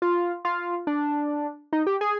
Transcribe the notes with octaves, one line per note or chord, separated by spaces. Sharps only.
F4
F4
D4
D#4
G4
G#4